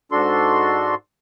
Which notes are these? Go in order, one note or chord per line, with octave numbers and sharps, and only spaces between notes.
G#2 D4 F#4 A4 C6